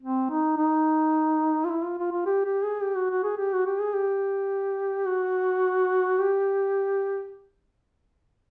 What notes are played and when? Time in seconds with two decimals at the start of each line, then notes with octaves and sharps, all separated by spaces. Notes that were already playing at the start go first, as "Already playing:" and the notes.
0.02 C4
0.30 D#4
0.57 D#4
1.65 F4
1.71 E4
1.84 F4
1.99 F4
2.12 F4
2.26 G4
2.45 G4
2.64 G#4
2.83 G4
2.96 F#4
3.10 F#4
3.24 G#4
3.38 G4
3.53 F#4
3.67 G4
3.81 G#4
3.94 G4
5.07 F#4
6.20 G4